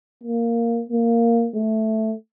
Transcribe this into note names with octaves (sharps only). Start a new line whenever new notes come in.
A#3
A#3
A3